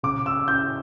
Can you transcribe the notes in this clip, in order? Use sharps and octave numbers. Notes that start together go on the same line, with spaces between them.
C#3 D6
E6
E4 G6